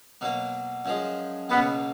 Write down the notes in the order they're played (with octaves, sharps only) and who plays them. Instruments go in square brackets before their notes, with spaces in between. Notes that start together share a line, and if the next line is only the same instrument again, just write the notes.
[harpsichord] B2 F#3 A#3
F#2 F3 G#3
[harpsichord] C#2 B2 F#3 A#3 [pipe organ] B3